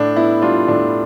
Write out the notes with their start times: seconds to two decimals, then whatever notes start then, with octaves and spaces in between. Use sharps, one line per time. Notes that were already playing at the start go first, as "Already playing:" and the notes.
Already playing: A2 D4
0.16 B3 E4
0.42 G3 D4 F4
0.68 A2 D4